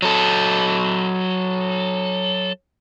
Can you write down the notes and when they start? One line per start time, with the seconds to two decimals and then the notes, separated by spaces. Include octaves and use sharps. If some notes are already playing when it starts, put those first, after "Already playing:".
0.02 F#3 A4